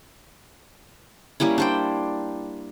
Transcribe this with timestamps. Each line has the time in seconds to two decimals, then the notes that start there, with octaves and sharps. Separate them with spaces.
1.40 G3 A#3 C#4 E4
1.58 D4 C5 G5